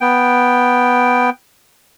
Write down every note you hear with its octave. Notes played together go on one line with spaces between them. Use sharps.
B3 G5